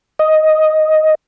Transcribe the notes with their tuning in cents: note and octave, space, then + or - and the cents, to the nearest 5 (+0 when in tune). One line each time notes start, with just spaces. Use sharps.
D#5 +5